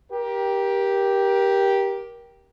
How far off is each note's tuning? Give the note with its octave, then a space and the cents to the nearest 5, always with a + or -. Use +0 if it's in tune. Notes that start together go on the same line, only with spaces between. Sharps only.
G4 +0 A#4 +25